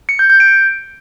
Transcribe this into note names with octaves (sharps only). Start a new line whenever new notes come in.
C#7
G6
G6
D7